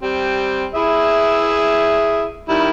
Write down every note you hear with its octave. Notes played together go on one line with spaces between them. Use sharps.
G3 C4
E4 G#4 E5
D#3 G3 E4